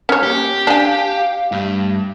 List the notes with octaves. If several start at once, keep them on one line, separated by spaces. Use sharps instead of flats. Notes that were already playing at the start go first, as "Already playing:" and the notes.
C#4 C#5
A#3 G4
D4 F5 G#5
G2 A3